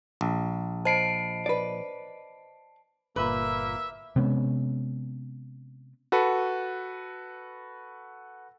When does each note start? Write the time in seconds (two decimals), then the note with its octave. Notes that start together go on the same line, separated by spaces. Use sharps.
0.21 A#1
0.85 C5 D#5 A5 B5 C7 D7
1.46 B4 D5
3.16 G1 A#2 A#3 B4 E5
4.16 C3 G#3 B3 C#4
6.12 F#4 A4 B4